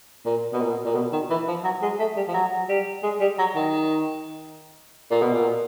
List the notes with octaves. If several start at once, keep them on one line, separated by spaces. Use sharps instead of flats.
A#2
B2
A#2
A#2
B2
D#3
E3
F3
F#3
G#3
A3
G3
F3
F#3
G3
G#3
G3
F#3
D#3
A#2
B2
A#2